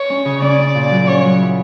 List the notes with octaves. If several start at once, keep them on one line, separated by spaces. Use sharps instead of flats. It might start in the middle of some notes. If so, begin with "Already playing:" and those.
Already playing: C#5
C#4
C#3
C#4 D5
C#4
A#2
F#3
C#4 C#5
F#3
E4